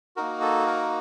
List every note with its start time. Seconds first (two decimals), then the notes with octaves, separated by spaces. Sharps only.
0.16 A#3 D#4 F#4 A#4
0.42 A4
0.66 A#4